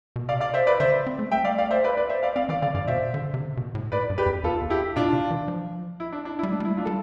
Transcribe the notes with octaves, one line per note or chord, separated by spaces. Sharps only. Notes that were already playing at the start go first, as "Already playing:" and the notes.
B2
C3 D5 F5
D5 F5
C5 E5
B4 D5
D3 C5 E5
C4
A3
G3 E5 G5
A3 D5 F5
D5 F5
C5 E5
B4 D5
B4 D5
C5 E5
D5 F5
C4 D5 F5
E3 D5 F5
D3 D5 F5
G2 D5 F5
B2 C5 E5
D3
C3
D3
B2
A2
A2 B4 D5
G2
G4 B4
F2
E2 F4 A4
E2
E4 G4
B2 D4 F4
C3
E3
F3
E4
D4
D4
E4
G3
A3 D4
G3
E4
A3
D4 F4
G3 A4